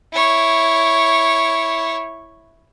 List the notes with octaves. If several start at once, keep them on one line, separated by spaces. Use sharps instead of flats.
E4 C#5